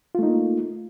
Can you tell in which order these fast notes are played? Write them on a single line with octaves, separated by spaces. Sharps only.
F4 A3 D#4 A#3